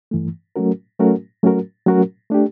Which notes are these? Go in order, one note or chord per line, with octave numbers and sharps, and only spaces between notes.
G2 E3 A3
F#3 A3 C#4 F#4 A#4
F#3 A3 C#4 F#4 A#4
F#3 A3 C#4 F#4 A#4
F#3 A3 C#4 F#4 A#4
A3 D4 G4